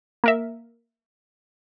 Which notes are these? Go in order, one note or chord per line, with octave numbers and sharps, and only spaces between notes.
A#3 A#4 E5